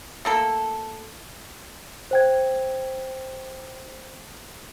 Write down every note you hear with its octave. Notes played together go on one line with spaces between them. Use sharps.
A3 A#3 A4
C5 G5 G#6